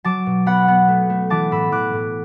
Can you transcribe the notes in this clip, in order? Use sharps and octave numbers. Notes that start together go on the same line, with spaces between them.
F#3 A5 D6
B2
B3 F#5 B5
B3
A3
A3
E3 A5 D6
A2 B5 E6
E3 D6 F#6
A2